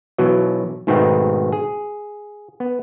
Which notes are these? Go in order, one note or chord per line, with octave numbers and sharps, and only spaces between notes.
B2 E3 F#3
G#2 B2 D#3 A3 B3 C4
G#4
B3